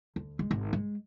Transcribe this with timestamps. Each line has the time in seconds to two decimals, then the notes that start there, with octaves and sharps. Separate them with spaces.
0.16 D2
0.39 G#3
0.51 G#1
0.73 G#3